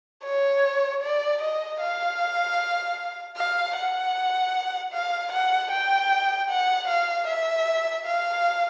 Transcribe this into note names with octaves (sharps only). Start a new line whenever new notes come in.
C#5
D5
D#5
F5
F5
F#5
F5
F#5
G5
F#5
F5
E5
F5